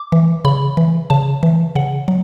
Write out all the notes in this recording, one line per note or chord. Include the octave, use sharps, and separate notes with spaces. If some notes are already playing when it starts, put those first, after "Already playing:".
Already playing: D6
E3
C#3 B5
E3
C#3 A5
E3
C#3 F#5
F#3